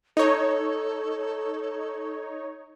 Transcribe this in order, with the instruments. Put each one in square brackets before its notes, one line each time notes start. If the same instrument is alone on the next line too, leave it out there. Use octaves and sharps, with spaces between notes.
[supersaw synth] D#4 C#5 [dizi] A4